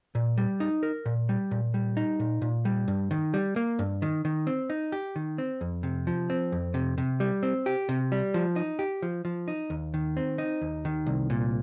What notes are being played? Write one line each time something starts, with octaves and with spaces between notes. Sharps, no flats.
A#2
G3
D#4
A#4
A#2
G3
A#2
G3
D#4
A#2
A#2
G3
G2
D#3
G3
A#3
G2
D#3
D#3
C4
D#4
G4
D#3
C4
F2
C3
F3
C4
F2
C3
C3
G3
C4
G4
C3
G3
F3
D#4
G4
F3
F3
D#4
D#2
D#3
C4
D#4
D#2
D#3
C2
A#2